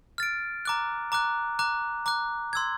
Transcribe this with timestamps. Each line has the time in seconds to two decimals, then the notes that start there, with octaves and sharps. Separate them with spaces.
0.18 F6 A6 D7
0.65 A#5 D6 F#6
1.12 A#5 D6 F#6
1.59 A#5 D6 F#6
2.06 A#5 D6 F#6
2.53 C6 E6 G#6